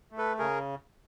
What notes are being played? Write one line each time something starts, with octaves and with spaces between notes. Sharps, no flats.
A3
A4 B4
C#3 G#4 A#4